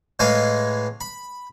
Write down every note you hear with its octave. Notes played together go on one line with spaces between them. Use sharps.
A2 E3 G#3 F5 G#5
B5